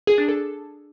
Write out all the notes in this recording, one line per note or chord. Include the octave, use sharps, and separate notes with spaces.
G#4
D4
A4